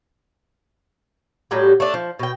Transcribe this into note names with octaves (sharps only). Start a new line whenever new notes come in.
A2 F#3 G3 G4
A3 D4
F3
B2 G5